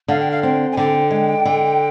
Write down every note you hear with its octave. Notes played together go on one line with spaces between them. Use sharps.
D3 F5
G5
F5
C4 G5
G#5
D3 G5
G#3
D3